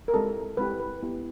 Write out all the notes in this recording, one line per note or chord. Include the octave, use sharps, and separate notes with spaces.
A#4
G#3 C4 E4 G4 A4
G#3 C4 E4 G4 B4
B4
B3 E4 G4